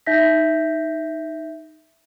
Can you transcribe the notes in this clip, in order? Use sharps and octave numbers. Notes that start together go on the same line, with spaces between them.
D#4 E5 G6 A#6 B6